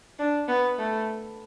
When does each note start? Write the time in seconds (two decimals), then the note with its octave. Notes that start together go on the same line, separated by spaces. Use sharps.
0.19 D4
0.48 B3
0.78 A3